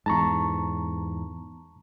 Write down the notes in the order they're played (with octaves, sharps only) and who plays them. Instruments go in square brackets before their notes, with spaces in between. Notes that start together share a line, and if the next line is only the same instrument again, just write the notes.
[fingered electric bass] E2 G#2 [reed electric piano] A5 A#5 C#6